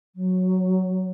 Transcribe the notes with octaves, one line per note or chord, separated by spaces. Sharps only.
F#3